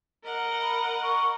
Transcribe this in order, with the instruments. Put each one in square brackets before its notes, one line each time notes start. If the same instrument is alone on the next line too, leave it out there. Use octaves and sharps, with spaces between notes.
[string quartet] A#4 D#5 F#5
[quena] B5
C#6